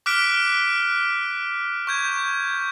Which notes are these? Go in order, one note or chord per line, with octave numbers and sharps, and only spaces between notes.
D6 F6 F#6 B6 D7
C#6 G6 G#6